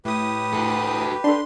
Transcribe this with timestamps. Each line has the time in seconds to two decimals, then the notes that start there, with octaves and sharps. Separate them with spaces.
0.05 A2 G4 B4 D#6
0.54 F#4 A4
1.24 D4 A4 C6